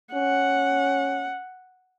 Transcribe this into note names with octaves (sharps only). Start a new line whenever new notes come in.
C#4 F#5